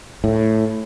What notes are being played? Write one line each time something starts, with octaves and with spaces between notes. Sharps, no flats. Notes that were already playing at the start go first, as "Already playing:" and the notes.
A2